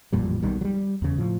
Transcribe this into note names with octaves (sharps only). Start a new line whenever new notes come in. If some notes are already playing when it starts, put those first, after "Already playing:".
A1 F2 A#2 G3
B1 B2 D#3 G3
F#3 G3
E2 C#3
A2 F3